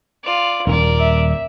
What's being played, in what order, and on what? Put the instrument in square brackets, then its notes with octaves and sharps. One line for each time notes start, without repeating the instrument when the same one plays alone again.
[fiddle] F4 D5
[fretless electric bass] D#1 [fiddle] A#4 D5
[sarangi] E5